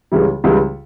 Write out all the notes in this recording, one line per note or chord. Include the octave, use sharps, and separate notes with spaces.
C#2 C#3 E3 G3
C#2 C#3 E3 G3